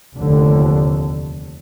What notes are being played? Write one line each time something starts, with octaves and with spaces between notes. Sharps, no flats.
F1 D#2 D3